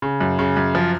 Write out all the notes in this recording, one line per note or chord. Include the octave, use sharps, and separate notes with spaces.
C#3
F#2
C#3
F#2
F3